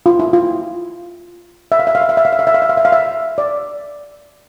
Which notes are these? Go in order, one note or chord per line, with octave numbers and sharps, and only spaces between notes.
F4
E4
F4
E5
F5
E5
F5
E5
F5
E5
F5
E5
F5
E5
F5
E5
F5
E5
F5
E5
D5